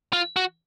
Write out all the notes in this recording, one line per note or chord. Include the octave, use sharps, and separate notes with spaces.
F4
F#4